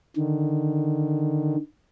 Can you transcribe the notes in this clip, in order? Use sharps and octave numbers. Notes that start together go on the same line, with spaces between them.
D3 D#3